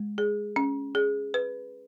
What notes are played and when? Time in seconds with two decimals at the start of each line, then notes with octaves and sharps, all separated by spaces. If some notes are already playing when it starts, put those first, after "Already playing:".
Already playing: G#3
0.18 G#4
0.56 C#4
0.95 G#4
1.34 B4